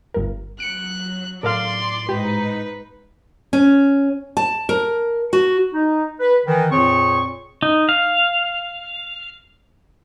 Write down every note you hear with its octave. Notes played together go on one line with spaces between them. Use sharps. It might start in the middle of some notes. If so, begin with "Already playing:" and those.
G1 G2 A#4
F#3 F#6 C#7 D7
A2 A4 A#4 D5 F5 C6
G#2 D#4 G4 B4
C#4
A5
A#4
F#4
D#4
B4
D#3 E3
F2 A#2 C4 G#4 C#5 C#6
D#4
F5